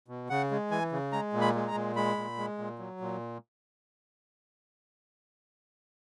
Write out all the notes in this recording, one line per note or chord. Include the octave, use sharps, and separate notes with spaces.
B2
C#3 F#5
G#3
E3 G#5
C#3
G#3 A#5
A#2
B5
G#3
A#5
A#2
G#3 B5
A#2
G#3
A#2
F#3
A#2